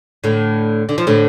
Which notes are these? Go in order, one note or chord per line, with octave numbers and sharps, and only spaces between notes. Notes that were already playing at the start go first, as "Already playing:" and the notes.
A2 D3
D3
F3
A2 D3